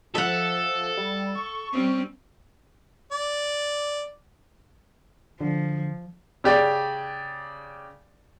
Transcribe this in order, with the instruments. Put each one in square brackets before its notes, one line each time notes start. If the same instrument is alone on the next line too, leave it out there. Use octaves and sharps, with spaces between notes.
[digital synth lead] F3 [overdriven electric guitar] A4 [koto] E5 F#5
[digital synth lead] G3
C#6
[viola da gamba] G3 C4 C#4
[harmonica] D5
[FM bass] D3 [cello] F3
[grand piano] C#3 G4 D5